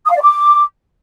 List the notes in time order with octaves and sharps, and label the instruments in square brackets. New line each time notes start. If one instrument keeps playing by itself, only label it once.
[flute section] D#6
F5
D5
D6